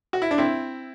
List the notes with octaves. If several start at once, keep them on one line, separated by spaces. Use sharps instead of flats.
F#4
E4
D4
C4 E4